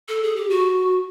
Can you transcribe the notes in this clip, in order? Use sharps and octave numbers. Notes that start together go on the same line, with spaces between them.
A4
G#4
G4
F#4